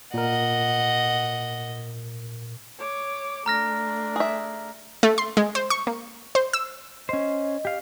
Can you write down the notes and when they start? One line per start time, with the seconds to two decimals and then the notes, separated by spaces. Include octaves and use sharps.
0.14 A#2 A#4 D#5 F#5
2.79 C#5 D6
3.46 A3 D4 A#5 F6 A#6
4.16 G#4 E5
5.03 A3
5.18 C6
5.37 G#3
5.55 C5
5.70 C#6
5.87 A#3
6.35 C5
6.53 E6
7.09 C#4 C5 D#5
7.65 G4 F5